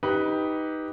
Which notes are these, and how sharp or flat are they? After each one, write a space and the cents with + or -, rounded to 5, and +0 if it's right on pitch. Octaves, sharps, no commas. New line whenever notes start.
D#4 +10 G4 +0 B4 +0